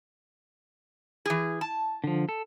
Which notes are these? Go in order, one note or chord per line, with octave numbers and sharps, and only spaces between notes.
E3 G#4
A5
D3 F3
A4